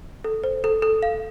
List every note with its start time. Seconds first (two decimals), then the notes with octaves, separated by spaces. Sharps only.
0.24 A4
0.44 C5
0.64 A4
0.82 A4
1.03 F5